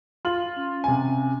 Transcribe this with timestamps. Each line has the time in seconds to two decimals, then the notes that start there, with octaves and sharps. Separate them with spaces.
0.25 F4 F#7
0.56 C#4
0.84 C3 G#5